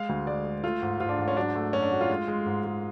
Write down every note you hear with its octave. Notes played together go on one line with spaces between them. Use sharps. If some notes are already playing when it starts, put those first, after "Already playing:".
Already playing: G#3 F5
D2
G#3 D5
G#3
A3 F4
G#2
G#2 F4
D4
G#2
C#4
F#3 D4
A3
F#2 C#4
D4
A3 F#4
F4
G#3
G#3
G#2
G#3